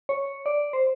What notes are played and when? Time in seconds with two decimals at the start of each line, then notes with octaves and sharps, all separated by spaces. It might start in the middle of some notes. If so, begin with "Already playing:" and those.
0.09 C#5
0.46 D5
0.73 C5